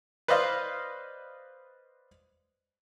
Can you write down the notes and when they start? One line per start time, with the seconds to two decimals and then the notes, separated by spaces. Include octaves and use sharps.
0.28 B4 C5 D5 D#5 F5